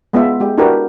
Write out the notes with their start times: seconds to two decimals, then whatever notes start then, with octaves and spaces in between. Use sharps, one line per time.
0.13 G#3 B3 F4 E5
0.40 G#3 G4
0.58 D4 E4 F#4 G4 A#4 B4